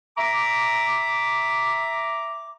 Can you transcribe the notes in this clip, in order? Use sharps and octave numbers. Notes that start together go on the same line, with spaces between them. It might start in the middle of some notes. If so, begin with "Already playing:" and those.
E5 A#5 D6